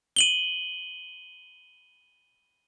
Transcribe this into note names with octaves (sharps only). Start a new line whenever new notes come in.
D#7 F#7 G7